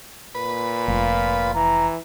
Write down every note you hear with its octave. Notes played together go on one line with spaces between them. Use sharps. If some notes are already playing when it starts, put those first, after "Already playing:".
A#2 B4
F1 F4
E3 A#5